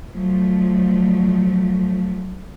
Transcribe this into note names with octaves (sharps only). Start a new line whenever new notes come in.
F3 F#3 A3